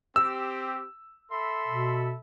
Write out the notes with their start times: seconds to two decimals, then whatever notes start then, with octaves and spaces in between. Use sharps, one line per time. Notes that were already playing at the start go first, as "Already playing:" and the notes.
0.16 C4 G4 E6
1.31 A4 E5 B5 C6
1.68 B2